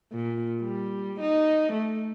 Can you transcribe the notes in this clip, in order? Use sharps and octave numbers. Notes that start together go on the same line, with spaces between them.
A#2
G3
D#4
A3